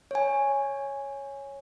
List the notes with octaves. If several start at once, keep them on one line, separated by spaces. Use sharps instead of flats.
C#5 G#5